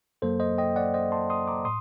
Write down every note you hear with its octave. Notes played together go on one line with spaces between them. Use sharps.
F#2 F#3 A#3 A4 C5
C5 D#5
D#5 G5
D5 F#5
C5 D#5
A5 C6
C6 D#6
A#5 D6
A2 C6 D#6